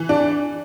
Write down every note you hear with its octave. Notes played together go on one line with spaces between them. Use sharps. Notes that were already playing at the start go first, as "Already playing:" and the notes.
Already playing: E3
D4